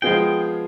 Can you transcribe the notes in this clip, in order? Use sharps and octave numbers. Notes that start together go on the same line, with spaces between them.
F3 G#3 B3 F4 G#4 G5